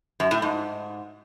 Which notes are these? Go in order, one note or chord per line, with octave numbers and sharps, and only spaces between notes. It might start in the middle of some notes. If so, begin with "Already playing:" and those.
F#2
A2
G#2